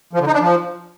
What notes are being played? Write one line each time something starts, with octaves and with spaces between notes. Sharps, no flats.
F3
D3
D#4
D4
F3